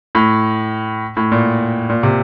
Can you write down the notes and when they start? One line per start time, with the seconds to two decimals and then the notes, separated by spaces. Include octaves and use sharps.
0.15 A2
1.17 A2
1.32 A#2
1.89 A#2
2.03 C3